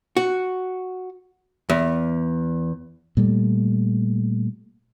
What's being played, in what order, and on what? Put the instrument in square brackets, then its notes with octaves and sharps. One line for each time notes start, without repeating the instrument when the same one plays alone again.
[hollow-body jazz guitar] F#4
E2
[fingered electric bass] A#2 G3 A3